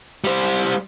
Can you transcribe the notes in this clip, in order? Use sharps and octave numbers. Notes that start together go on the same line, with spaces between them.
G3 C5